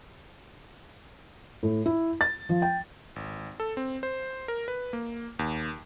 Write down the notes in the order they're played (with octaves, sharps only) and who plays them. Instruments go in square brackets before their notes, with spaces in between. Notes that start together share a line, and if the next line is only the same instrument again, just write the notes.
[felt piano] A2
E4
A6
F3
G5
[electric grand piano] G#1
A4
C4
C5
A#4
B4
A#3
D#2